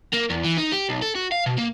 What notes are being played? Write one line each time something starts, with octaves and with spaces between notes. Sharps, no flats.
A#3
E2
E3
D#4
G4
B1
A4
F#4
F5
B2
A#3